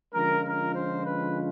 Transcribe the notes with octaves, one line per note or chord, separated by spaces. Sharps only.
D3 F3 G#3 C#4 F4 A#4
A#4
C5
B4